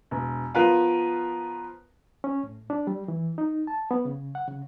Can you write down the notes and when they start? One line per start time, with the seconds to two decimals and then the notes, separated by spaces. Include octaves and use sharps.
0.11 E1
0.55 F3 B3 F4 A#4 B4 F5
2.24 C#4
2.43 A2
2.70 D4
2.87 G3
3.08 E3
3.38 D#4
3.67 A5
3.91 B3
4.05 C#3
4.35 F#5
4.48 C#3